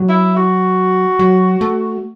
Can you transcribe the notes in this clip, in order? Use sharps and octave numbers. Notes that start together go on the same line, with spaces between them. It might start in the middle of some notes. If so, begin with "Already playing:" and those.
Already playing: F#3
E4
F#4
F#3
A3